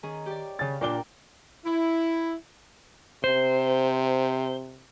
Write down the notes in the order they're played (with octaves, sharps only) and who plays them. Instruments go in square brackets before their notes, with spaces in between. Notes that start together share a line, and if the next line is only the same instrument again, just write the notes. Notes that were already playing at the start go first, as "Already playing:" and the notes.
[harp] D#3 C#4 G#4
G4 D5
[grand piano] C#3 A6
[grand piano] A#2 D4 G7 [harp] A#4 G5 D6
[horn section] E4
[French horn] C3 [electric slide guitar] C5